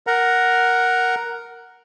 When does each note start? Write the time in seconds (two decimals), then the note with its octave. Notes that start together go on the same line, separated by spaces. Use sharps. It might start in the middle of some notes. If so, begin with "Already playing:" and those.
0.07 A#4 F#5 A#5